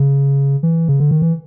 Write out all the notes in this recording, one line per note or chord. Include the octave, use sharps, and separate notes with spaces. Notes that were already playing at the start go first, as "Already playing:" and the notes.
Already playing: C#3
E3
C#3
D3
D#3
E3